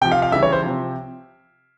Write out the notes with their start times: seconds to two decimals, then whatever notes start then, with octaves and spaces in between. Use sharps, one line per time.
0.01 C3 G5
0.04 F3
0.12 F5
0.22 F5
0.32 C#3 E3 G3 E5
0.43 C#5
0.52 C5
0.63 C3 F3